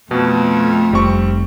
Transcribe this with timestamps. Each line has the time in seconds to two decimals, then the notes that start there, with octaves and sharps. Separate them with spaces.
0.11 F2 B2 A3 F#4
0.93 F1 G3 C4 C#6